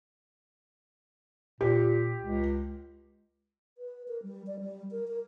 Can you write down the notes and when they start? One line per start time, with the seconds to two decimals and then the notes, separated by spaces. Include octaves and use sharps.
1.61 A#2 G4
2.22 C#2
3.78 B4
4.08 A#4
4.23 G3
4.47 D5
4.60 G3
4.91 A#4
5.07 A#4